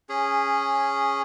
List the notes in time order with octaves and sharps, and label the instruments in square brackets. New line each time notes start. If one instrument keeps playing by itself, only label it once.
[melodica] C#4 G#4